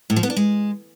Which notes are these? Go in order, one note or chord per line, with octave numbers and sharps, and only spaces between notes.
A2
F3
B3
D4
G#3